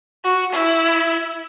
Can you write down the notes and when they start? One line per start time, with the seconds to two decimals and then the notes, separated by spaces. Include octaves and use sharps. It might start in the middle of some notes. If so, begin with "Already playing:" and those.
0.24 F#4
0.53 E4